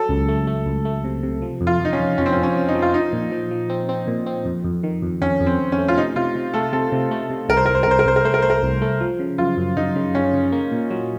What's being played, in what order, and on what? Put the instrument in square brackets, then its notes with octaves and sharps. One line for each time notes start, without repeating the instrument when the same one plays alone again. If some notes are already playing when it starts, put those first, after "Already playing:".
Already playing: [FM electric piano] F#3 [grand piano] A4
[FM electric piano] C#2
A3
A3
C#2
A3
C3
C3
F3
F2
[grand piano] F4
[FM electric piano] F2 [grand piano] D#4
[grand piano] C#4
[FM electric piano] F2
[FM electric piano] F2 [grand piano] C#4
[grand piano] C4
C#4
[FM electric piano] F2
[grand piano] C#4
[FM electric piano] F3
[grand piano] D#4
[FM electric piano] F3
[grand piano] F4
[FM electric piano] F3 [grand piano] D#4
[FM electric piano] A#2
F3
F3
C4
C4
A#2
C4
F2
F2
D#3
F2
[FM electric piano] F2 [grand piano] C#4
[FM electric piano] F2
[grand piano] C4
[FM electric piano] F2
[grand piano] C#4
[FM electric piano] A3
[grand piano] F4
[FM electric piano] C3 [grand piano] D#4
[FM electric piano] C3 [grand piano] F4
[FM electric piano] C3
[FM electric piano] A3 [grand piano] A4
[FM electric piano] C3 [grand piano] A4
[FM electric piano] C3
A3
C3
[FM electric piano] C2 [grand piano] A#4
[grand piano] C5
[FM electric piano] C2 [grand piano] A#4
[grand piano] C5
A#4
[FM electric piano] C2 [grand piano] C5
[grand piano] A#4
[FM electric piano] C2 [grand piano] C5
[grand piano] A#4
[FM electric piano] A3 [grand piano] C5
[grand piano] A#4
[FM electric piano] A3 [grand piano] C5
[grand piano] A#4
[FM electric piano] C2
A3
F3
C#3
[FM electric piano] F#2 [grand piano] F4
[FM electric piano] F#2
[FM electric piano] F#2 [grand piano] D#4
[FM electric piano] C#3
[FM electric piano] C#3 [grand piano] C#4
[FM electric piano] C#3
A#3
A#2
F#3